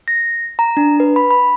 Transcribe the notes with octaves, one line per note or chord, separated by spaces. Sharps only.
A#6
A#5
D4
B4
B5
B5